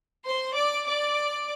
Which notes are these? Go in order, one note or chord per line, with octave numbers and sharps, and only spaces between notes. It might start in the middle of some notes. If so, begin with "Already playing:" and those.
C5 C6
D5 D6
D5 D6